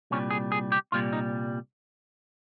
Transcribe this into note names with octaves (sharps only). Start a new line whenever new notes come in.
C2 A#2 G3 C#4
G#4
G#4
G4
C2 A#2 G3 F4
D#4